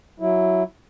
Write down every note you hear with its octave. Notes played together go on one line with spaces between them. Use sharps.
F#3 E4